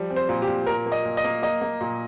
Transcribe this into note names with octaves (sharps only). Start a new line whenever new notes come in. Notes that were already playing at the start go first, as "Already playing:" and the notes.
Already playing: F3 G3
C4
C5
A#2
G4
A#2
A#2 A#4
A#3
D#5
A#2
D#5
A#3
A#3 D#5
A#3
A#2